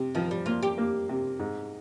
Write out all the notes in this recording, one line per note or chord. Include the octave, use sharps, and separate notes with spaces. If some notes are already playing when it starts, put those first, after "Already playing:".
Already playing: C3
D#3 F3
G3
A#3 F4
G4
A#3
C3
G#2